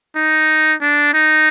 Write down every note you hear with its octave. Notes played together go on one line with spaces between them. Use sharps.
D#4
D4
D#4